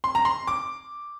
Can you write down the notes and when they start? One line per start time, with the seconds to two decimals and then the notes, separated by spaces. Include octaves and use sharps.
0.04 C6
0.15 A#5
0.25 C6
0.47 D6